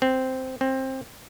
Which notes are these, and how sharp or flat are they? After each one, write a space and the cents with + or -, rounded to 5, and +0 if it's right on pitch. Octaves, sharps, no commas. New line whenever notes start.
C4 -5
C4 +20